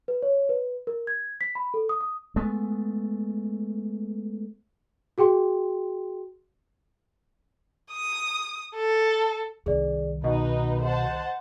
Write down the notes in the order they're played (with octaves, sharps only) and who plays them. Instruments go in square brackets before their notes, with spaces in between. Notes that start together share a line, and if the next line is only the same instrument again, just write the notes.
[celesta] B4
C#5
B4
A#4
G#6
B6
B5
A4
D#6
D#6
[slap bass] G#3 A3 B3
[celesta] F#4 G#4 G5 C6
[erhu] D#6
A4
[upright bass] C2 D#3 [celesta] G#4 D5
[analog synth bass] B2 [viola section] D#4 B4 [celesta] D#5
[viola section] C5 F#5 A5 [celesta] D#5